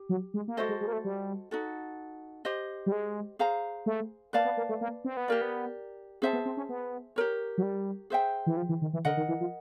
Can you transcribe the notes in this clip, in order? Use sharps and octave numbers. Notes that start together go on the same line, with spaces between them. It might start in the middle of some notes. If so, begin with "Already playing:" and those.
Already playing: G4
F#3
G#3
A#3
A3 F#4 A4 C5 D#5
G#3
G#3
A#3
A3
G3
D#4 F#4 A4
G4 C5 D#5
G3
G#3
G#4 C5 F5 A#5
A3
A#3 B4 D5 F5 A5
B3
A#3
A3
A#3
C4
B3
A#3 G4 A#4 D5
B3
C4 G#4 C5 E5 A5
B3
C4
C#4
B3
G4 A#4 C#5
F#3
G3
G#4 C5 E5 G5
E3
F3
E3
D#3
E3
D3 A#4 D#5 F#5
D#3
E3
F3